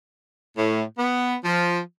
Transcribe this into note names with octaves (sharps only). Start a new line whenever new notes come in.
A2
B3
F3